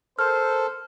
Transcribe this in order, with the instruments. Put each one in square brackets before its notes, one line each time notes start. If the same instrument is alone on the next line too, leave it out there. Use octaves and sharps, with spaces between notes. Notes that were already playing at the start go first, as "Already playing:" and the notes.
[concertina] A4 [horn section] A#4 C5 [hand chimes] F6